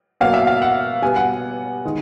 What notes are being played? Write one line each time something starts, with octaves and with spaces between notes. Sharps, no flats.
B2 F#3 A#3 F5
E5
F5
F#5
B2 G3 B3 G#5
F#5
D#3 G#3